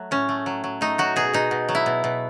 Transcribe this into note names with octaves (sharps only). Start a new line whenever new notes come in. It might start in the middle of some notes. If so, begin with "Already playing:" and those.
Already playing: F#3 A3
A2 C#4
A3
F#3
F#3
A3 D#4
F#3 F#4
B2 G#4
B2 D#4
B2
F#3
E4
B2
B2